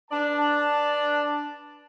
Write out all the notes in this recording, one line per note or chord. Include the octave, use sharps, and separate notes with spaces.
D4 B4 D5 A5